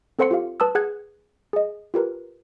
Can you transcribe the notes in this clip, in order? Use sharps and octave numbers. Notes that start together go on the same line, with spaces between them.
C4 A4 C5 F#5 C6 C#7
F4 G4 F5
B4 A5 D#6 E6
G#4 F#5 F#6 G#6
G#4 D#5
F4 G4 A#4 B4